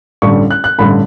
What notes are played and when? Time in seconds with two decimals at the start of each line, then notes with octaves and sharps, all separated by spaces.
0.22 A1 G2 D3 G3 C#6
0.51 F#6
0.64 F#6
0.79 A1 G2 D3 G3 B5